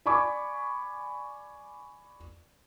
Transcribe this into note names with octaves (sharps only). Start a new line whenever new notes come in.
D5 G#5 B5 C#6 D6 G#6